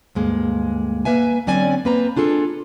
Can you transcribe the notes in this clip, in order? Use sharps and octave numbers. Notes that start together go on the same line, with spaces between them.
D2 G2 G#3 A#3
A#3 B4 E5 G#5
D3 F#3 C4 C#4 D5 G#5
A#3 C4 B4 C5 A#5
D4 F4 G#4 A4